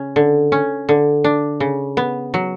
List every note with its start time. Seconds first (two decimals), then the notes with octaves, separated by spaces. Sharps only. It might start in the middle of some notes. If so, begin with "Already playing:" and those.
Already playing: C#3 C#4
0.16 D3
0.52 C#4
0.89 D3
1.24 D4
1.60 C#3
1.97 B3
2.34 F#3